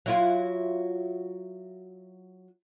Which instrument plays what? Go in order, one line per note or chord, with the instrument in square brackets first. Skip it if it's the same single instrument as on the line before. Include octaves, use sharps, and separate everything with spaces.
[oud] F#3 E4 F4